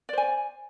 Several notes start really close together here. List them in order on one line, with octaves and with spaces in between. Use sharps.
D5 C5 G#5